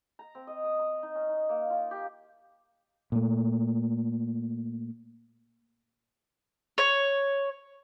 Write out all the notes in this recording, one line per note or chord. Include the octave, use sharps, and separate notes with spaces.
A#5
C4
D#5
D#6
A#5
D#4
C#4
D#4
A#3
F4
G4
A#2 A3
C#5